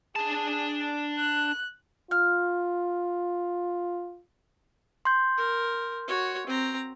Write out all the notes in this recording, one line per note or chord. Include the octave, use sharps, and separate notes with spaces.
D4 G#4 A5
F#6
F4 F6
C6 G6
A#4
F#4 C#5
C4 A#5